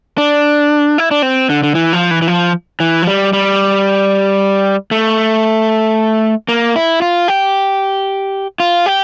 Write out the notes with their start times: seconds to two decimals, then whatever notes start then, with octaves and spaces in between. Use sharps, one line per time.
0.18 D4
0.98 E4
1.11 D4
1.22 C4
1.49 D3
1.63 D3
1.75 E3
1.93 F3
2.11 E3
2.22 E3
2.28 F3
2.80 E3
3.02 F3
3.07 G3
3.33 G3
4.91 A3
6.48 A#3
6.76 E4
7.02 F4
7.28 G4
8.60 F4
8.86 G4